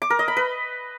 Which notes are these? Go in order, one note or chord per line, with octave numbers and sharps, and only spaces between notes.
D6
A#4
D#5
B5
B4